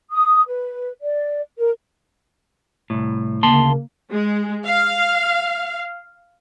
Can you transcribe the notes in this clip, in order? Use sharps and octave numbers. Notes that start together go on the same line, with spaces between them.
D#6
B4
D5
A#4
C2 F#2 A2
D2 C#3 A#3 A5 C6
G#3
F5